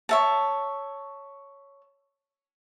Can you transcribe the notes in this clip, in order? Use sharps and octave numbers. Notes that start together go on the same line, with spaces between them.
C#5 E5 A5